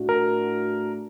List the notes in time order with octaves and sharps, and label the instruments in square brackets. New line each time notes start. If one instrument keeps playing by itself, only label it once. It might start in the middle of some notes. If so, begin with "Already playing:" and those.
Already playing: [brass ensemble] A2 A3 D4 F#4
[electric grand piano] A#4